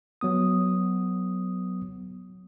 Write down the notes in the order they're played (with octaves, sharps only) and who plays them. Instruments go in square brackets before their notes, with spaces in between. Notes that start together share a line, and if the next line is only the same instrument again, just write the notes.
[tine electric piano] F#3 B3 D#6